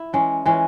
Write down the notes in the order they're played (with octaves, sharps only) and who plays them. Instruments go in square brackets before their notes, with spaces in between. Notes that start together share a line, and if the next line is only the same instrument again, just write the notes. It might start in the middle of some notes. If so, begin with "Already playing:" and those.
Already playing: [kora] E4
E3 G#3 C#4
E3 G#3 C#4